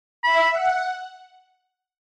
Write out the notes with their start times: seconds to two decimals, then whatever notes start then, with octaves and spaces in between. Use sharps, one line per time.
0.23 E5 B5
0.52 F#5